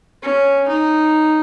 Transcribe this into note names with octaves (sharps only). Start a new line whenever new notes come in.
C#4
D#4